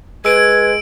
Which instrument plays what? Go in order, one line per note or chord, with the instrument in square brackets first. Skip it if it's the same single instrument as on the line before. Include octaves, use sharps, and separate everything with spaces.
[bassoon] G#3 [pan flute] B4 [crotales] E6 D7 [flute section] G#6